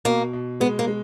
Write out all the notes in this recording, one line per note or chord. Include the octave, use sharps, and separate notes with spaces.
B2 A#3
B2
G#3 B3
A#3
G#3